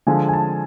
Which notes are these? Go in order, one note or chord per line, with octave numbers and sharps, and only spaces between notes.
D3 F3 G#3 G#5
G#5
A5